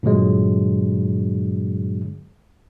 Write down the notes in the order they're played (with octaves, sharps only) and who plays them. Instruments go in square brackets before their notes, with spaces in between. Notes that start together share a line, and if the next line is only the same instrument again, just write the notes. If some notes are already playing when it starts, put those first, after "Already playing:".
[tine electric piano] G2 A#2 D3 F#3 G#3